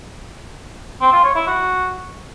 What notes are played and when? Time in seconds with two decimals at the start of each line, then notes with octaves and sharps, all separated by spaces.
1.01 C4
1.13 F4
1.24 C#5
1.36 E4
1.47 F#4